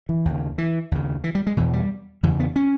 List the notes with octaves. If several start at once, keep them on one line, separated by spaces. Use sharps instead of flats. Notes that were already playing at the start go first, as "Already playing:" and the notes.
E3
D#2 C#3
E3
D#2 C#3
E3
G3
G#3
E2 B2 E3
G3
E2 C#3 E3
B3
C#4